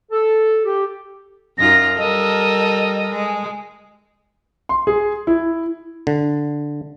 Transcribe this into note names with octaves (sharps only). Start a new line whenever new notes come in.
A4
G4
F#2 D#4 F4 A#6
G3 A4 A#4 D#5
G#3
C6
G#4
E4
D3